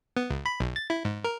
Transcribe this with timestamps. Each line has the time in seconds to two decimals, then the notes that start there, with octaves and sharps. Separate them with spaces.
0.17 B3
0.30 C#2
0.46 B5
0.60 B1
0.76 A6
0.90 E4
1.05 G#2
1.24 A#4